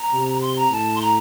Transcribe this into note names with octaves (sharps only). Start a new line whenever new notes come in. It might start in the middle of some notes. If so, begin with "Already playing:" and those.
Already playing: A#5
C3
C6
A#5
A2 A5
C6
A#5